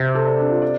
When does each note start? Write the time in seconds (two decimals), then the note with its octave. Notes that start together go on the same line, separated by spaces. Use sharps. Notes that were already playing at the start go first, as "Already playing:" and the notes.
Already playing: C3 G4
0.15 A4
0.27 D5
0.39 D4
0.50 F4
0.62 D5